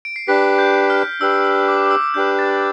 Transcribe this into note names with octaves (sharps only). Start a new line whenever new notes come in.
D7
C7
D4 G4 B4 B6
G6
F6
D4 G4 B4 E6
E6
D6
D6
E6
D4 G4 B4 G6
A6